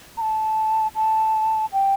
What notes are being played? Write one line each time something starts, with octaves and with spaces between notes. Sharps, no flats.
A#5
A5
A5
G5